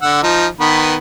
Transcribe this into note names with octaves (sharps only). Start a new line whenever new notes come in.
D3 F#5 E6
F3 D#4
D#3 B3 B4